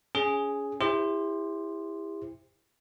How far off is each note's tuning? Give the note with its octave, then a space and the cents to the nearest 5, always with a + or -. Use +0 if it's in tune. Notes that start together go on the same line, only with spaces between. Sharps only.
C#4 +25 G#4 +0
E4 +0 G4 +40 C5 +0